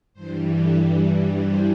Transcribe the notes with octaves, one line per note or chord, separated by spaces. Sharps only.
G2 E3 G3 C5
A4
C5